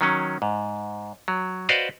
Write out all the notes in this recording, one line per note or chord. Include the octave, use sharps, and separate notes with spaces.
D#3 F#3 C#4
G#2
F#3
F#4 B4 C5 D5 D#5 F5